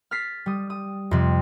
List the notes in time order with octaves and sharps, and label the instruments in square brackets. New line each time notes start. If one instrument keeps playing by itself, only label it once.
[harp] F6 A6 B6 C7
G3 D#6
D#6
F2 C3